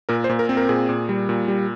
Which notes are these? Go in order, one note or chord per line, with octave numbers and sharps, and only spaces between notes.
A#2 A#4
C5
A#2
A#4
C4
A#4
A#2 G#4
A#2
G3
A#2
G3